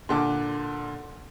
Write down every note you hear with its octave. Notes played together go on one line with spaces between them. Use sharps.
A#2 D3 A5 D6